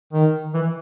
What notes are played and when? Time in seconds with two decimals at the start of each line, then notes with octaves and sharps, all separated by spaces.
0.13 D#3
0.54 E3